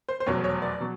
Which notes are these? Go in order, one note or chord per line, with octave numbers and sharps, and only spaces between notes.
C5
C5
F1 E2 B2 F#3 C#5
C#5
D5
B2 F#3